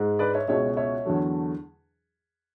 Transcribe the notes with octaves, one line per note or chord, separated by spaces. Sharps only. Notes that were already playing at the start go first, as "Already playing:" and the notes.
Already playing: G#2 G#3
B4 D5
C#5 E5
C#2 B2 G#3 C#5 E5
C#5 E5
E2 D3 F#3 A3